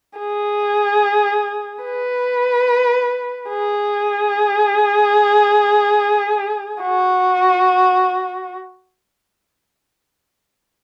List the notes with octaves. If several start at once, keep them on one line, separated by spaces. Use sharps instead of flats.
G#4
B4
G#4
F#4